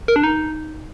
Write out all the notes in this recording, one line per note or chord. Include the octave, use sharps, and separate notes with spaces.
A#4
D4
D#4